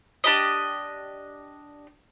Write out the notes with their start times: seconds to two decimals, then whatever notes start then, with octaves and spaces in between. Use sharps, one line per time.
0.24 D4 G4 D#5